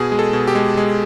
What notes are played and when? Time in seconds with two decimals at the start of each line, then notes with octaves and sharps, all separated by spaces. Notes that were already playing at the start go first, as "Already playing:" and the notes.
Already playing: B2 G#4
0.12 G#3
0.19 A4
0.33 B2
0.48 G4
0.55 G#3
0.77 G#3